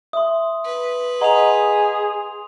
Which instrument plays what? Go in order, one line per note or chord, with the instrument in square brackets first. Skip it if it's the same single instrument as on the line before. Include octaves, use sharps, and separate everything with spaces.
[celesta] E5 [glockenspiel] C6 D#6
[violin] B4
[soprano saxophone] G#4 [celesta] D#5 F#5 A#5 [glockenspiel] C6 D#6 F7